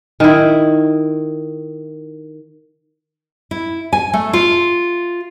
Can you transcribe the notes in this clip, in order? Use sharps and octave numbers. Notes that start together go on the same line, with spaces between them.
D#3 E4
E4
G#5
A3
F4